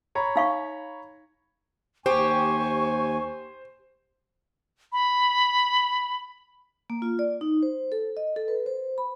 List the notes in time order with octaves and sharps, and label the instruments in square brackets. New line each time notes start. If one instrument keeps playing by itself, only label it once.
[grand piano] C#5 A#5 B5
[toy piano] D#4 F5 C#6
[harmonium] D#2 G#5 [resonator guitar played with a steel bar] G4 [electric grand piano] C5 [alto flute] C#6
[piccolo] B5
[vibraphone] A#3
F4
D5
D#4
C5
A4
D#5
A4
B4
C5
B5